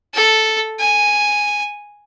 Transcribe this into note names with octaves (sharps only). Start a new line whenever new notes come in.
A4
G#5